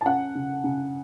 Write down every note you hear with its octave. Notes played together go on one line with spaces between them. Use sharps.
A5
C#4 F#5
C#3
C#3